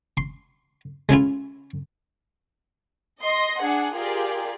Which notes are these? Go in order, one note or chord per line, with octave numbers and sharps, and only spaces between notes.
C6
G#3 C#4 E4 F4
D#5 C6 A#6
D4 G#4 F#5
F4 G4 G#4 A#4 D5